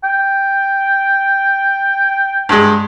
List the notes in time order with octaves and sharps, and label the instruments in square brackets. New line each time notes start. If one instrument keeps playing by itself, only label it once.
[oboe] G5
[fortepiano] G2 G#3